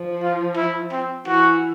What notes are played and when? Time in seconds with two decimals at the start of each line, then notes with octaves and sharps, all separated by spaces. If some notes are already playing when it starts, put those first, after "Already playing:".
Already playing: F3
0.22 F4
0.57 E4
0.92 C4
1.26 E3 F#4